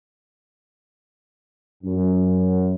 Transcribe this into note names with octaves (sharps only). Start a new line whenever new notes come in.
F#2